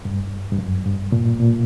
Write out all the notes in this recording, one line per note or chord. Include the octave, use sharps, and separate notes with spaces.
G2
G2
F#2
G2
A#2
A#2